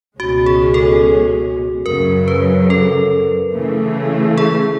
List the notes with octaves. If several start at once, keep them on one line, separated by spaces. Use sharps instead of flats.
C#2 B2 G#3 C#4 F#4
G#4
A4
F#2 C#3 F#3 A#4
B4
A4
C#3 E3 A3
G#4